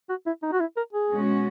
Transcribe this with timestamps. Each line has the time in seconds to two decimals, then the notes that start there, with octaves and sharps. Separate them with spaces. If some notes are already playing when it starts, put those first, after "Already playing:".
0.09 F#4
0.26 E4
0.43 D#4
0.53 F#4
0.60 E4
0.77 A#4
0.93 G#4
1.11 B2 G#3 C#4 F#4